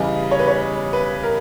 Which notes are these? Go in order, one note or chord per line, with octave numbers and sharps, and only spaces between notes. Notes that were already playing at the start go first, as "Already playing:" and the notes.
Already playing: E2 C#3 G3 B3 D#5
C#5
B4
C#5
B4
A#4